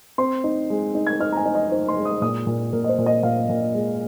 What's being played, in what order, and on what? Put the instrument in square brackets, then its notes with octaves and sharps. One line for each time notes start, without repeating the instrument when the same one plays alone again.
[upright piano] C4 C6
D#4
G#3
D#4
G#6
D#4 F6
A#5
G#5
D#4
D#5
D#4 C5
C6
G#3
D#6
A#2 D#6
A#2
A#2 A#4
D#5
C5
A#2
D#5
A#2 F5
A#2
G#3